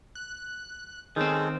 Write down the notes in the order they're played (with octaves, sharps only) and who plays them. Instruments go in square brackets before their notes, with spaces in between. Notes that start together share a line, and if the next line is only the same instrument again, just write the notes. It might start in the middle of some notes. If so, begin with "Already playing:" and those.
[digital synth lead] F#6
[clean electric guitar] D#3 C4 [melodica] G#3 C#4 A4 [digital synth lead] G#4